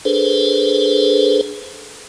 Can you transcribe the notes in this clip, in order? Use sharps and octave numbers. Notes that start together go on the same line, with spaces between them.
D4 G#4 A4 B4 C5